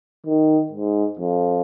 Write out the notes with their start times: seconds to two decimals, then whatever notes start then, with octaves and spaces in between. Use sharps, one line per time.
0.26 D#3
0.72 G#2
1.19 F2